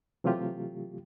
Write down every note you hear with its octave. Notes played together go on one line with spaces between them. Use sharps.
C3 E3 F#3 A3 F4 G4